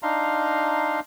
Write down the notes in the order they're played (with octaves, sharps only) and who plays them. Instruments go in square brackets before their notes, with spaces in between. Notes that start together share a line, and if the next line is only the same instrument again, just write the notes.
[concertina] D4 D#4 F5 A#5 C6